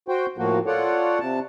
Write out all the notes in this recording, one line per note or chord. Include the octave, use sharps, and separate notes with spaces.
F#4 C5 G5
A2 F3 A#3 F#4
F4 A4 C#5 D5 F#5
C3 A5